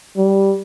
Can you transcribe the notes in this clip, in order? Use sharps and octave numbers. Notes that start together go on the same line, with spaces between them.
G3